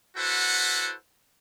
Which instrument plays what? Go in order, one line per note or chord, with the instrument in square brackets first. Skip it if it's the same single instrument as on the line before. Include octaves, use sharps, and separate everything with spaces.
[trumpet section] E4 F#4 A4 B4 C5 F#5